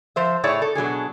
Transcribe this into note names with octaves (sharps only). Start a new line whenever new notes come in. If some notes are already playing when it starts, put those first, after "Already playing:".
F3 C5 E5
A2 G#4 C#5 D5 E5
A4
B2 F#3 D4 G#4